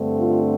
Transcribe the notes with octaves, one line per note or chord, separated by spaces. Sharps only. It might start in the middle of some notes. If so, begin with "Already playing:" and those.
Already playing: G2 D3 A3 C4
F4